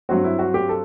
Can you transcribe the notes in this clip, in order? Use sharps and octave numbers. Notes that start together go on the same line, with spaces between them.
G2 F#3 C4 F#4
E4
F#4
G4
A4